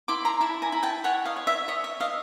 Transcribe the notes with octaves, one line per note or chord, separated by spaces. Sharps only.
E4 C6 D6
A#5 C6
E4 A5 B5
G#5 A#5
E4
G5 A5
C#5 F#5 G#5
D#5 F5
C#5
E5
C#5 D#5
E5
C#5 D#5 F5